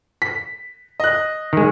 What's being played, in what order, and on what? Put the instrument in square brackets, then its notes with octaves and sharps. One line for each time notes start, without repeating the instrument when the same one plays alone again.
[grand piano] B6
D#5 F#6
[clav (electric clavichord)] D#3 G#3